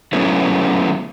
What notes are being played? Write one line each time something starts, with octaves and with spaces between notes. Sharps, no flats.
F#3 A3 B3 C#4 E4